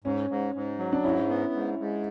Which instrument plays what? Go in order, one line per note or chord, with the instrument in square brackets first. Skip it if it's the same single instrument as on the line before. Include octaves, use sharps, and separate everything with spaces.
[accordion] G#2 [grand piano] C#4
[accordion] G#2
G#2
F#3
[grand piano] D4
[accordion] G#2 [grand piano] C#4 E4
[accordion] B3
G#2
G#2